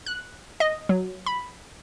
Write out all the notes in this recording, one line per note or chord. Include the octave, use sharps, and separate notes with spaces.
F#6
D#5
F#3
B5